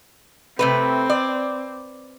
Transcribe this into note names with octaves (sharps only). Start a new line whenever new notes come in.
C3 A3 C4 B4
D5